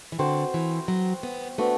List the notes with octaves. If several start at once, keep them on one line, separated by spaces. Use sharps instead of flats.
E3
D3 C4 F#4 C5
E3
F#3
B3
A3 B3 D4 F#4